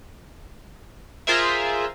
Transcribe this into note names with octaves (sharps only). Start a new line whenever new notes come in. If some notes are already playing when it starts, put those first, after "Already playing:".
F4 G#4 A#4 C5 E5